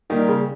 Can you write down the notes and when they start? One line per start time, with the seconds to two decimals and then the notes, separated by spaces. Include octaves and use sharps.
0.10 A#2 D#3 G3 A#3 D#4
0.29 C#3